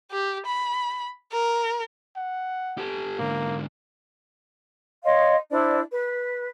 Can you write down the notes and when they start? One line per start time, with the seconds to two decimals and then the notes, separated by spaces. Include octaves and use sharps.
0.12 G4
0.46 B5
1.32 A#4
2.16 F#5
2.78 G4 A4
3.19 G#2 D3 A#3
5.04 C#5 D#5 F5 C6
5.51 D4 E4 C5 D5
5.92 B4